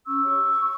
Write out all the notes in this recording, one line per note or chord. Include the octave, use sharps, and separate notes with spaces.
C#4 C#6 E6
G4 C#5